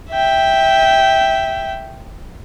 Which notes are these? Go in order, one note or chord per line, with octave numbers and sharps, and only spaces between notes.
E5 G5